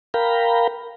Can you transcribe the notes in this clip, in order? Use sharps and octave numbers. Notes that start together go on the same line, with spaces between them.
A#4 F5 G5 A#5 B5